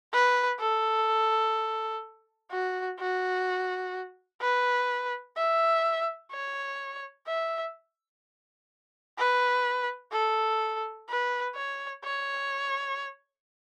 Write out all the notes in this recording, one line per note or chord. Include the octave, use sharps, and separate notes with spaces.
B4
A4
F#4
F#4
B4
E5
C#5
E5
B4
A4
B4
C#5
C#5